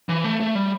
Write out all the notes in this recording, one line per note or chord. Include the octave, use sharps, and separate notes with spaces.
E3
A3
A3
G3